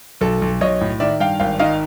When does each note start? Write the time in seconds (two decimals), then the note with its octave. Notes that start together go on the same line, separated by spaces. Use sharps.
0.21 B1 A4
0.42 B1
0.61 B1 C#5 D#5
0.81 A2
1.00 D#3 D5 E5
1.20 G2 F5 G5
1.40 G#1 F5 G5
1.59 D#3 D#5 F5